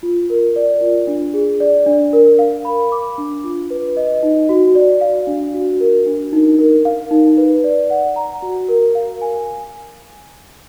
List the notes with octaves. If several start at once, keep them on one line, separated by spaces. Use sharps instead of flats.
F4
A#4
D5
F4
D4
G#4
D5
D4
A#4
F5
B5
D6
D4
F4
B4
D#5
D#4
F#4
D5
F5
D4
F#4
A#4
D4
D#4
A#4
F5
D#4
B4
D5
F#5
A#5
F#4
A#4
F5
G#5